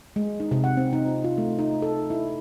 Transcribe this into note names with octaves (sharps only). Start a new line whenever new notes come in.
G#3
D#4
C3
F#5
C4
D#4
F4
F4
A3
D#4
A4
E4